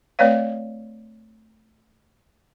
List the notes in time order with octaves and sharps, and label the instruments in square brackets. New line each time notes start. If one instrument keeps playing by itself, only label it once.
[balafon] A3 C4 B4 C#5 D5 F5